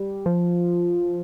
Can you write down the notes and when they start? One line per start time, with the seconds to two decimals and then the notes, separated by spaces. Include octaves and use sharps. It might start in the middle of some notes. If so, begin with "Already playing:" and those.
Already playing: G3
0.26 F3